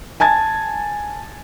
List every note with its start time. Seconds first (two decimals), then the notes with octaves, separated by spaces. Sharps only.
0.20 G#5 A5 G#6 A6